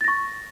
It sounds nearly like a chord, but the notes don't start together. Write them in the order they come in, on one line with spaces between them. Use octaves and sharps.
A6 A#6 C#6